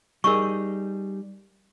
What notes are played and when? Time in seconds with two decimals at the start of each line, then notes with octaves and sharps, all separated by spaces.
0.24 G3 D#4 G#4 A#4 C#6